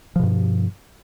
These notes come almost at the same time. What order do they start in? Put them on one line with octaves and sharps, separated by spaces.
F3 B2 G2